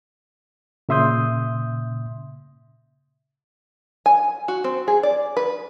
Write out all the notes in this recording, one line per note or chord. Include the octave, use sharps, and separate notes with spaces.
A#2 C#3 E5 C6 D#6 G6
G#5
F#4
C4
G#4
D5
B4